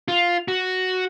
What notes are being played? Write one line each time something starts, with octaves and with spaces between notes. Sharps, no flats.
F4
F#4